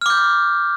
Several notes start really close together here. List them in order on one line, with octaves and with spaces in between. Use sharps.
F6 D6 G6